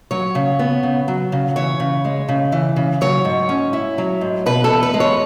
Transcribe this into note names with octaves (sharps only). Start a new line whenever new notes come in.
F#3 C#5
C#3
B3
C#3
F#3
C#3
E3 C#5
C#3
G#3
C#3
E3
C#3
F#3 C#5
G#2
C#4
E4
F#3
G#2
B2 B4
A4
E2
B4
G#3
C#5